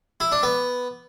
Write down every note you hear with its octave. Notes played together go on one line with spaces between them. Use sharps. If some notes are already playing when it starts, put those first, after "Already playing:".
E4
D4
B3